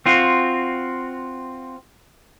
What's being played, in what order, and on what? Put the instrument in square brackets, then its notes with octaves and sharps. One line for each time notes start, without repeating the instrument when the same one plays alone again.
[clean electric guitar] C4 F4 F#4